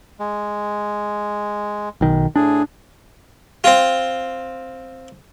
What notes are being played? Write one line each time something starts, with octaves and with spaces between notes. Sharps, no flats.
G#3
B1 D#3
A2 D4 G#4
C4 F4